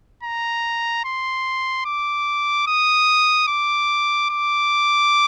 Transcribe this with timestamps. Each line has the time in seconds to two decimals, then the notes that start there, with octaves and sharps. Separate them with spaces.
0.23 A#5
1.05 C6
1.85 D6
2.67 D#6
3.48 D6
4.30 D6